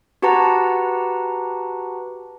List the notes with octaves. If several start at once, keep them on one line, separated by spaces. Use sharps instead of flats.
F#4 G4 B4 F#5 A5 A#5